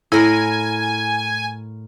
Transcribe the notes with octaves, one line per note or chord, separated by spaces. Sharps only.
A2 E4 A#4 G#5